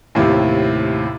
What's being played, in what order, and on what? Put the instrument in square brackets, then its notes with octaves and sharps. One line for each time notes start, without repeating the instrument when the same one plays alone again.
[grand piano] D#2 A2 C3